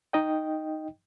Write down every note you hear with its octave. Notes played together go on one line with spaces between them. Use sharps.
D#4 D#5 G5